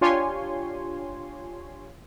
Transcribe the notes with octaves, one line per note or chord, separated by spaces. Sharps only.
D4 F4 G4 C#5 G#5 C6